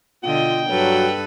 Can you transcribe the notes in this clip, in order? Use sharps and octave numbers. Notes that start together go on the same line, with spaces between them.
B2 D3 F4 D#5 G5
G2 F#3 A4 B4